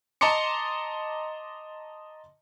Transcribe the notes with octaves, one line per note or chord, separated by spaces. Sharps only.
D#5 A5 A#5 C6 D6 C#7